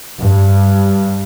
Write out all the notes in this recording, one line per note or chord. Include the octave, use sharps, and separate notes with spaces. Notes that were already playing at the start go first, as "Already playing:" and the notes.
G2